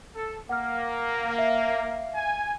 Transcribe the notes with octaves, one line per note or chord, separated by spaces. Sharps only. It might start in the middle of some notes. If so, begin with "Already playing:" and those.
A4
A#3 F#5 F6
E5 F5 C7
G#5